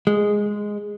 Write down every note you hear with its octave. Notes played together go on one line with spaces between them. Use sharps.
G#3